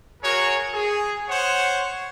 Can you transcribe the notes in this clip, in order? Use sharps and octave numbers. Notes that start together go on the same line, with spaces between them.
F#4 G#4 A#4 C#5
G#4
C5 C#5 F#5